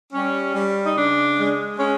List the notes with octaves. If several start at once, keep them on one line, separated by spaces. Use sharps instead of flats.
G3 C#4
G3
D#4
C#3 D4
G#3
G#3 C#4